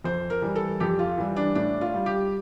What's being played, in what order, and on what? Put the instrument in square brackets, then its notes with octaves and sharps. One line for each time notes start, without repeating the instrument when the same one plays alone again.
[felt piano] F2 C5
A#4
E3 G3
A4
F2 G4
F4
E3 G3
D4
A2 D4
F4
G3
G4